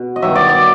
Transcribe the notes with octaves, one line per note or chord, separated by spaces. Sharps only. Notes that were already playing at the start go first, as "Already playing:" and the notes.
Already playing: B2
D#5
G2 D#3 F#3 E5
D5
D5